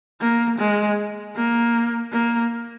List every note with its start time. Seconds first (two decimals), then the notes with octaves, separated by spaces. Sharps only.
0.21 A#3
0.59 G#3
1.36 A#3
2.12 A#3